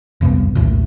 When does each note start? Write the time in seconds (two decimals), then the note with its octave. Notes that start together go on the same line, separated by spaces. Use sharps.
0.21 F1 C2 G2 B3
0.55 A#1 D#2 A2